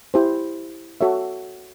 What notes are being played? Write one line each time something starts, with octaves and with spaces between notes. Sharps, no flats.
E4 G4 C5
F#4 A4 C#5 E5